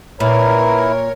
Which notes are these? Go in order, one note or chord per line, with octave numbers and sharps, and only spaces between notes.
A#2 E4 A#4 B4 C#5 A#5